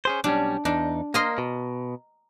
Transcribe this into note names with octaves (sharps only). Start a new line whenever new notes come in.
C#4 G#4 C5
B1 G3 C#4 D4
E2 D4 D#4
A#3 A#4 D#5 C6
B2